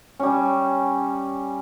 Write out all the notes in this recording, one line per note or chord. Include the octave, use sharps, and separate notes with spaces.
G3 C#4